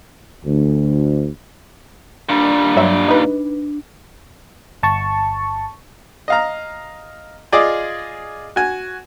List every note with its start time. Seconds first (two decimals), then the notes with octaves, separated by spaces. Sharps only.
0.45 D2
2.29 A#2 G3 D4
2.76 G2 F#3 E5
3.08 D#4 B4
4.83 G1 A5 C#6
6.28 D#5 F5 A#5
7.52 F4 G#4 D5 D#5 D6
8.56 F#4 G#5